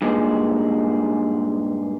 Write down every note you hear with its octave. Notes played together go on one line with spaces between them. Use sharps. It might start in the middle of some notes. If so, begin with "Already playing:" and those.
G2 A#2 G#3